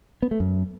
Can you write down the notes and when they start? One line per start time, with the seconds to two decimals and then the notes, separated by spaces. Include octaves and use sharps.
0.22 B3
0.31 A3
0.40 F#2